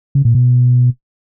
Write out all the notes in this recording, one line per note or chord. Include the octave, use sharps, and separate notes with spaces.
C#3
A#2
B2